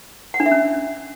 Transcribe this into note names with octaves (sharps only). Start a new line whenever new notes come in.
F#5
D4
E5
C#4